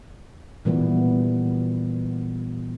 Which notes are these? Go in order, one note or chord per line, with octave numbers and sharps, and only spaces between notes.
A#2 E3 G3 B3